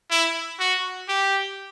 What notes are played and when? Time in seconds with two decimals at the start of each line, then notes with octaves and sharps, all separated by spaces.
0.10 E4
0.60 F#4
1.08 G4